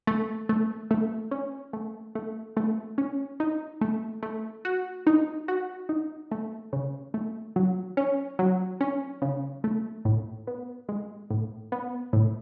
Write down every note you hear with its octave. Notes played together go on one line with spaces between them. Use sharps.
A3
A3
A3
C#4
A3
A3
A3
C#4
D#4
A3
A3
F#4
D#4
F#4
D#4
A3
C#3
A3
F#3
C#4
F#3
C#4
C#3
A3
A2
B3
G#3
A2
B3
A2